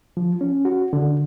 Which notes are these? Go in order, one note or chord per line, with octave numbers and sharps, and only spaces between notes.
F3
C#4
F#4
D3